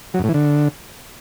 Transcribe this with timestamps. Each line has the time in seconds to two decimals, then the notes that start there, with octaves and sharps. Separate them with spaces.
0.14 F#3
0.19 F#2
0.24 A2
0.29 E3
0.34 D3